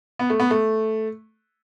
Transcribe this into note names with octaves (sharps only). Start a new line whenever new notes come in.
B3
A3
B3
A3